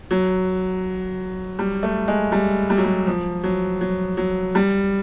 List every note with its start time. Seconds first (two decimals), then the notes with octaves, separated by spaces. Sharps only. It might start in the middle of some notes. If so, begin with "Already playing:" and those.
0.11 F#3
1.59 G3
1.83 A3
2.08 G#3
2.32 G3
2.70 G3
2.77 F#3
2.84 G3
3.07 F3
3.44 F#3
3.81 F#3
4.17 F#3
4.55 G3